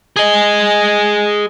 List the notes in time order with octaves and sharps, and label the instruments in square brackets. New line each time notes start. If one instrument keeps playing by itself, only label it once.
[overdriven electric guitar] G#4 D#5